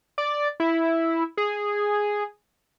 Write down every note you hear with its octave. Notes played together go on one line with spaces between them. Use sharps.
D5
E4
G#4